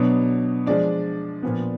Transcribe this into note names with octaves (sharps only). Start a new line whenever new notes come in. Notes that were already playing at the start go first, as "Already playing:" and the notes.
Already playing: B2 F#3 B3 D4
F3 G#3 D4 D5
A#2 F3 B3